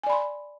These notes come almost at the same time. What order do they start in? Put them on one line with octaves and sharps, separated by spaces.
G#5 D5 B5 C6